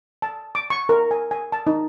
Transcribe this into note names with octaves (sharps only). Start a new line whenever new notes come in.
A5
D6
C#6
A#4
G#5
G#5
A5
D#4